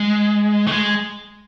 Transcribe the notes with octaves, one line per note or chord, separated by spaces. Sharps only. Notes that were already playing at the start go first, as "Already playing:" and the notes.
Already playing: G#3
A3
G#3